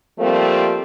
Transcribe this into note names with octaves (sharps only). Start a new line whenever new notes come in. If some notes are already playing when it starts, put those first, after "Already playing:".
F3 G3 A3 A#3 C4